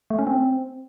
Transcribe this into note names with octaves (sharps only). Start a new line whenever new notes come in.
A3
C#4
C4